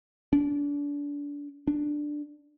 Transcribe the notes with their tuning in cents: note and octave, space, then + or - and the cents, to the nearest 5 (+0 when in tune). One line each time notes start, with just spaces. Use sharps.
D4 -30
D4 +5